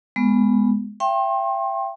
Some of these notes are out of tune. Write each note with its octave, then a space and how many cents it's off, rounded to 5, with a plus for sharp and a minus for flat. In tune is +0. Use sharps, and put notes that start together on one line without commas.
G#3 +0 B3 +0
E5 +35 G5 +0 C6 +40